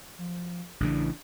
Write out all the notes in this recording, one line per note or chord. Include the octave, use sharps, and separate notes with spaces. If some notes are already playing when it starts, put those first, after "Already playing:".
F3
A1 C#3 E3 D4